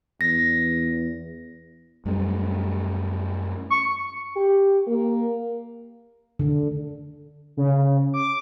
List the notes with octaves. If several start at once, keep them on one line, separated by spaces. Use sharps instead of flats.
E2 A#6
F#2 G3 A3
C#6
G4
A#3
D3
C#3
D6